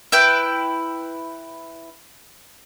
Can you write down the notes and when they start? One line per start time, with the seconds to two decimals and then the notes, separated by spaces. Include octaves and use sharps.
0.12 E4 B4 G5